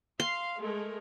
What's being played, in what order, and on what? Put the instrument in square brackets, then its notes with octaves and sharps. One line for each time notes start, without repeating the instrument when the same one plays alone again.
[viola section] F5 [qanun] C6
[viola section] G#3 A3 A#4